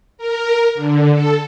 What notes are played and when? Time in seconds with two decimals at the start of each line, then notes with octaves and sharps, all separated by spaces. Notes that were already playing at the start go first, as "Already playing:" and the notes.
0.18 A#4
0.75 D3
1.11 A4